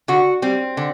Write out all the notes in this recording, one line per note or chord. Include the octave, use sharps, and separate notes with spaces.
D3 F#4
G3 C4
D3